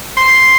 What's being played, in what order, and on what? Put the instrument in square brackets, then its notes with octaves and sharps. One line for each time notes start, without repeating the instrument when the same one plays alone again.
[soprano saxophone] C6